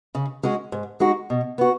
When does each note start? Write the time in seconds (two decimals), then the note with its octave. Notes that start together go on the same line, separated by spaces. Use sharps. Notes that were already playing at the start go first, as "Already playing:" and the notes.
0.15 C#3
0.43 G#3 C#4 F#4
0.72 G#2
1.00 G#3 D#4 F#4
1.30 B2
1.58 B3 F#4